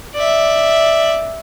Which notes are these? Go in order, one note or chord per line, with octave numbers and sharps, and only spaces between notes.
D5 E5